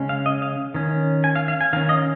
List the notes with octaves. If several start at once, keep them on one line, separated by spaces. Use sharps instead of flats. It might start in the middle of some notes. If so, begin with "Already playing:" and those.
Already playing: C#3 G#3 C#4
F5
D#5
F5
D#3 C#4
G#5
F5
F5
G#5
D#3 C#4 F5
D#5